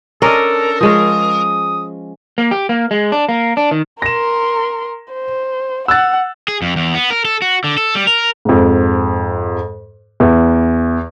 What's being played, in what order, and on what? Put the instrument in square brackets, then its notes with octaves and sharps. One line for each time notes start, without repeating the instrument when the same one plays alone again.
[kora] C#4 D4 D#5 [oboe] A4 [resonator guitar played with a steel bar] A#4
[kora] F3 G#3 C#4 [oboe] D#6
[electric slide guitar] A#3
G4
A#3
G#3
D4
A#3
D4
D#3
[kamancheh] A#4 C6 [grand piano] A#6 E7
[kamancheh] C5
[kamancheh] F#5 [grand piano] E6 F#6 A6
[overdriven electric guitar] G#4
F2
E2
B3
A#4
A4
F#4
D3
A4
G3
A#4
[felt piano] F2 G#2
E2